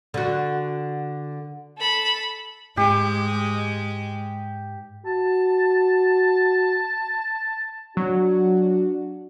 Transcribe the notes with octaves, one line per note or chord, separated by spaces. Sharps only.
D3 F#4
A4 B5
G#2 G#3 G4
F#4 A5
F#3 D4 F#4